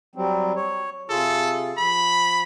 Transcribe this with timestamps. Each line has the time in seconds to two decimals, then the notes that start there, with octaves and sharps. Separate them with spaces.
0.15 F#3 G3 C4
0.56 C#5
1.10 C3 F4 G#4 A4
1.78 F3 B5